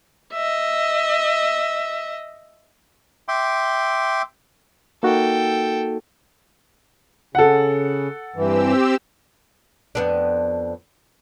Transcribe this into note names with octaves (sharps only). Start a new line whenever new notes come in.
D#5 E5
E5 G5 C6 D6
A#3 D#4 F#4 A4 G5
C#3 A4 F#5
G2 E3 C4 G4 E6
F2 B3 D4